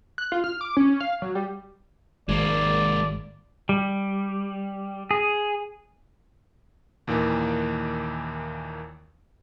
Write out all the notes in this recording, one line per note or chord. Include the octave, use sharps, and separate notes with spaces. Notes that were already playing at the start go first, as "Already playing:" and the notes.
F#6
F4
F6
D6
C#4
F5
F#3
G3
G#1 G#3 A#3 D5
G3
G#4
D#2 A#2 D#3 E3 A#3